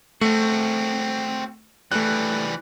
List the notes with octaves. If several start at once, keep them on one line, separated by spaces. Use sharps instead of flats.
A3 C4 F#4
E3 G3 A3 F#6